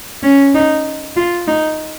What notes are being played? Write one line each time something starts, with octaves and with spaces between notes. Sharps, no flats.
C#4
D#4
F4
D#4